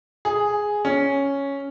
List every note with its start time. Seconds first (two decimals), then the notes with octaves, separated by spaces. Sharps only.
0.25 G#4
0.85 C#4